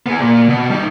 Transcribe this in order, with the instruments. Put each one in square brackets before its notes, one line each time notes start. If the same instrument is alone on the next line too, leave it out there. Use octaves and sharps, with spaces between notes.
[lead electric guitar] B3 G#4
A#2
B2
G3 D#4